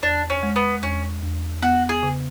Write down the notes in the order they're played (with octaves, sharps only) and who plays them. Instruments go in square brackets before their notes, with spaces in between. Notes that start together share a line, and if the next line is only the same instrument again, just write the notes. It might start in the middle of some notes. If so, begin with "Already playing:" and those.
[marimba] E2 [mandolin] D4
[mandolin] C#4
[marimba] G#3
[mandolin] B3
[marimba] E2 [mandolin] C#4
[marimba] E2
[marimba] B3 [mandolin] F#4
[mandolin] G#4
[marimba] C#3